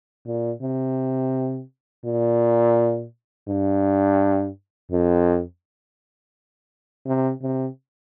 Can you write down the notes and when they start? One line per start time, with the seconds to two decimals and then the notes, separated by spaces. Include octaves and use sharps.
0.26 A#2
0.62 C3
2.05 A#2
3.48 G2
4.91 F2
7.06 C3
7.42 C3